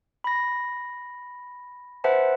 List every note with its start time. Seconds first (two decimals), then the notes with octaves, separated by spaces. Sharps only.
0.24 B5 A#6
2.04 B4 C5 E5 F#5 A5